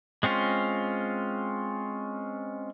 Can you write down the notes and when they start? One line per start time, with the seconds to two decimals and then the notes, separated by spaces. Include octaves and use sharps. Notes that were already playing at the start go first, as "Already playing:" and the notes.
0.23 G#3 C4 C#4 F4